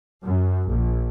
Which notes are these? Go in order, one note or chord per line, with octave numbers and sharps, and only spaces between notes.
F#2
A#1